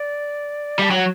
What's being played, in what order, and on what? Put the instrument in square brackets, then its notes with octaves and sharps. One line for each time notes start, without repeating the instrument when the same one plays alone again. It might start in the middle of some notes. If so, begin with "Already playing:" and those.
Already playing: [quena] D5
[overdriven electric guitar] G3 [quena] A5
[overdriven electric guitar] F#3 [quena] G5
[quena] F#5